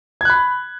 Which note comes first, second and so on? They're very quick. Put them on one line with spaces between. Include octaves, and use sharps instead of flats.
G#6 F#6 B5